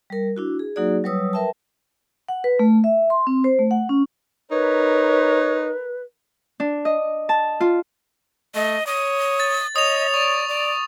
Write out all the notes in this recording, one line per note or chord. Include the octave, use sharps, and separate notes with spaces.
G3 A#4
D4 E4 F#4
G#4
F#3 A#3 D#4 F#4 G#4 D5
F#3 G3 B4 C#5 D#6 E6
A#4 B4 E5 G5 A5
F#5
B4
A3
E5
C6
C4
C5
A3
F#5
C#4
D#4 A#4 B4 C#5
D4
D#5
A5
F4
A3 D#5
C#5 D#6
A6
C#5 D#5 D#6 F7
D5 C#6
D5